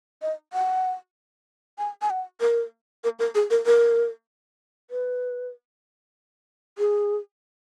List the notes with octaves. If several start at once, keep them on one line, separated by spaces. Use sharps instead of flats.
D#5
F#5
G#5
G#5
F#5
A#4
A#4
A#4
G#4
A#4
A#4
B4
G#4